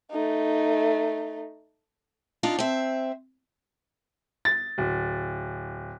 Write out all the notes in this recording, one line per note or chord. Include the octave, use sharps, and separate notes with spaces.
A3 D#4
D4 D#4 F4 F5
C4 E5
A6
D1